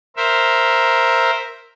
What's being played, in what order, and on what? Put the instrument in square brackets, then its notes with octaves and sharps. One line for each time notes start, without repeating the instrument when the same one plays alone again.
[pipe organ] A#4 C5 E5